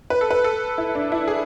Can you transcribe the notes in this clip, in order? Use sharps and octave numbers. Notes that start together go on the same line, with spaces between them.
B4
A4
B4
A4
E4
D4
E4
G#4